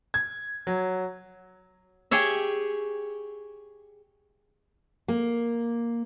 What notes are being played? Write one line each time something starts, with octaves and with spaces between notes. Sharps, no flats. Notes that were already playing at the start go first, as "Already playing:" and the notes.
G#6
F#3
G4 G#4 C#5 E5
A#3